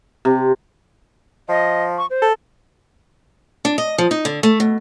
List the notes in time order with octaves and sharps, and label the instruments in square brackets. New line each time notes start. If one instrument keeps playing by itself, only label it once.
[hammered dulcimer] C3
[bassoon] F3 [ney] D#5
[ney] C#6
C5
[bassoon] A4
[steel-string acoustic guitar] D4
D#5
F3
D#4
D3
A3
B2